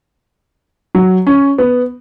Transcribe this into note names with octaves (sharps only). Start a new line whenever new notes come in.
F#3
C#4
B3